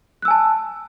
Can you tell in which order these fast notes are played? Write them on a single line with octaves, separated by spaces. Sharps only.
F#6 E6 G#5 A5